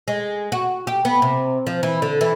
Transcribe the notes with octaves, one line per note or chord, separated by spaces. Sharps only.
G#3
F#4
G4
B3
C3
F3
E3
D3
E3